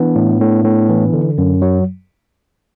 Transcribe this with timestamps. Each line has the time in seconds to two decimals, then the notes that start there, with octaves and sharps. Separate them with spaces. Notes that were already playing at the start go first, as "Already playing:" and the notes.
Already playing: E3 B3 D4
0.15 A2
0.41 A2
0.64 A2
0.89 E3
1.13 D3
1.38 F#2
1.62 F#3